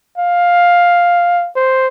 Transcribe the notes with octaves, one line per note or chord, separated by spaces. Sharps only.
F5
C5